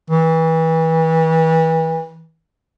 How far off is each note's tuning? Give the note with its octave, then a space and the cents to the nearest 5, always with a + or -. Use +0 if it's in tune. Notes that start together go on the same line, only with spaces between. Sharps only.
E3 -30